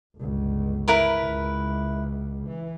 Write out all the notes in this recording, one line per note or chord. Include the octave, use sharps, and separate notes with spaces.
G1 C#2
E4 A#4 B4
C#2
E3